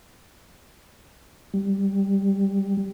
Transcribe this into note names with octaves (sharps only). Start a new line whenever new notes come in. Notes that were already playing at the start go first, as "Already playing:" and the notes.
G3